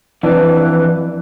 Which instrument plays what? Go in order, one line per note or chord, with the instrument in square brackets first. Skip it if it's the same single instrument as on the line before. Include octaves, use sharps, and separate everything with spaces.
[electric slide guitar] F2 E3 D4 [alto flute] B4